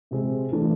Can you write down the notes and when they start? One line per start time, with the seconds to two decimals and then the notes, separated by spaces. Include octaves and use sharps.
0.11 C3 G#3 C4 G#4
0.52 E3 A3 D4